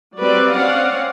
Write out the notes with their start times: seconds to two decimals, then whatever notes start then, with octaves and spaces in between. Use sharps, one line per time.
0.19 F#3 G3 C4 B4 D5
0.54 C4 C#4 D5 F5 F#5